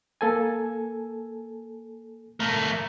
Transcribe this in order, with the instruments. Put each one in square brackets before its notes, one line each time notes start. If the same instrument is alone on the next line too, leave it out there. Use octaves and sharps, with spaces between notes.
[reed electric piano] A#3 A4 G#5
[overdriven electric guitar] A3 A#4